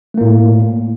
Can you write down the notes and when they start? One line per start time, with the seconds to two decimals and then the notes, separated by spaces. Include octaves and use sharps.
0.14 A3
0.18 A#3
0.21 A2